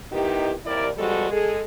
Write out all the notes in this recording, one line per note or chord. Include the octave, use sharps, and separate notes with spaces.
D#3 B3 D#4 E4 G4
D#2 C3 E4 A#4 D5
E2 F3 G3 G#3 F#4 A4
G#3 G#4 A4